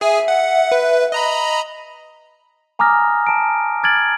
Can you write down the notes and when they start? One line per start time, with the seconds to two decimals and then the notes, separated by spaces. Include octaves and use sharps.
0.01 G#4 E5 G#5
0.28 F#5
0.72 B4
1.12 D#5 A#5 B5
2.79 G#5 A#5 D6 D#6 F6 A#6
3.27 A5 D7
3.83 D6 F6 G#6 A6 D7 F#7